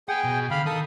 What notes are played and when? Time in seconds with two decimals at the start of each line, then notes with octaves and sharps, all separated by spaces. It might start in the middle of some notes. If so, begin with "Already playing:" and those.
0.09 B3 G#4 F#5 G5
0.24 B2
0.51 D3 F5 B5
0.66 D#3 A4 D#6